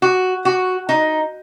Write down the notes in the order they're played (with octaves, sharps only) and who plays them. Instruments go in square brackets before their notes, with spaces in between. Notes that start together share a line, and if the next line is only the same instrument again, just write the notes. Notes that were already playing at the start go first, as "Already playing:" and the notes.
[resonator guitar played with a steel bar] F#4
F#4
D#4